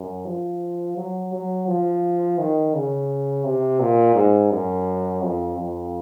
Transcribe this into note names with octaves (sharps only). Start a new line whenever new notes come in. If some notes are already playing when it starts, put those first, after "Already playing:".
Already playing: F#2
F3
F#3
F#3
F3
D#3
C#3
C3
A#2
G#2
F#2
F2
F2